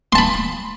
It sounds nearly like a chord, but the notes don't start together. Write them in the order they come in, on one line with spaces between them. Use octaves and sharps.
C6 A5 B5